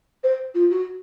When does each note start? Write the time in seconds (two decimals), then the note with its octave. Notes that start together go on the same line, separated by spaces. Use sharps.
0.23 C5
0.54 F4
0.70 F#4